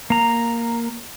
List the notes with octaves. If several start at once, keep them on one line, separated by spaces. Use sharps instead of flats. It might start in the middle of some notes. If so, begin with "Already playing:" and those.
A#3 A#5